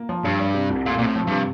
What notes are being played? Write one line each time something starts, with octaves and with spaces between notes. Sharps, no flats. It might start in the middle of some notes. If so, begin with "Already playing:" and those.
Already playing: A#3
F3
G2 G3
D4
C3
C2
A#2 A3
A#2
A2 C4
F3
G2 C3